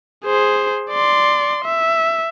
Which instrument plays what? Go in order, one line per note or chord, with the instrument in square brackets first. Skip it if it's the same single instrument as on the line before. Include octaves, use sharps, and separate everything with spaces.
[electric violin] G#4 C5
D5 C6
E5